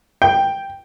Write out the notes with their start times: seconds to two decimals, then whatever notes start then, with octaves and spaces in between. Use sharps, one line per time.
0.22 G5